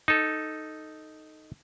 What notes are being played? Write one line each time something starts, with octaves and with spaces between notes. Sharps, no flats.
D#4 A4